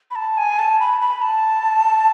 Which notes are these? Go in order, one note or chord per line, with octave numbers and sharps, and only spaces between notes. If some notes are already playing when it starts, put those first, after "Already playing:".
B5
A5
G#5
A5
B5
B5
A5